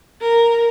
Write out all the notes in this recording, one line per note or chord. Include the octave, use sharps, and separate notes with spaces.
A#4